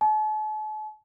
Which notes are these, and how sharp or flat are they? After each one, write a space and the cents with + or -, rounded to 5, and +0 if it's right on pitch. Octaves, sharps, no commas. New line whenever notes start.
A5 -45